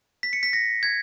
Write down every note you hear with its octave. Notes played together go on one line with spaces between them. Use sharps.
B6
C#7
B6
A#6
G#6